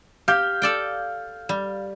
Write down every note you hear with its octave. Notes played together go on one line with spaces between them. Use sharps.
G4 F5 F6 G6
A4 D5 G5
G3